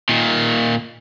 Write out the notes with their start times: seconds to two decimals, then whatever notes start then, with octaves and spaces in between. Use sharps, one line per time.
0.09 A#2 D#3